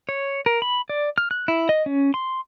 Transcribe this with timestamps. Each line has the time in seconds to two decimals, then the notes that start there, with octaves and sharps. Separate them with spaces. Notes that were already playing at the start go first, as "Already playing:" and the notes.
0.09 C#5
0.46 A#4
0.62 B5
0.89 D5
1.18 F6
1.31 F#6
1.48 E4
1.69 D#5
1.86 C#4
2.14 C6